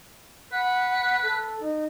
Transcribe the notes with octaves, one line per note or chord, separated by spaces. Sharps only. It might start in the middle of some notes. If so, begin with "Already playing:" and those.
B4 F#5
A4
D#4